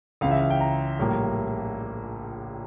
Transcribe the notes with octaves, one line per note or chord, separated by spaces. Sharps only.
C#2 C#3 E3 F5
E5
F5
G5
A#5
A#1 A2 G3 A#3